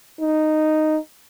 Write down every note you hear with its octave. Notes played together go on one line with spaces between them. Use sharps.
D#4